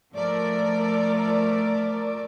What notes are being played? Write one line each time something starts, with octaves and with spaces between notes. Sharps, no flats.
F3 A3 A#4 D5